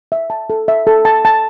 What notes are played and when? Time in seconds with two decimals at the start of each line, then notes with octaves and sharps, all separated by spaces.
0.12 E5
0.30 A5
0.50 A4
0.68 E5
0.87 A4
1.05 A5
1.25 A5